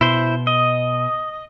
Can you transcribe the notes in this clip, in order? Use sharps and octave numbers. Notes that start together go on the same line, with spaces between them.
B2 E4 C5
D#5